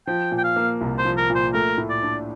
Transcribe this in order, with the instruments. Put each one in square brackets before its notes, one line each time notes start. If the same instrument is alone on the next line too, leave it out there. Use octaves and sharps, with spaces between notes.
[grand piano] F3 [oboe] G5
[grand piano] A#2
[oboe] G5
F5
[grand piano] A#3
C2
[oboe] C5
[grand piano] F3
[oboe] A#4
[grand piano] A#2
[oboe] C5
[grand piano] A3 [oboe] A#4
[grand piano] A2
[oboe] D5
[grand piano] D4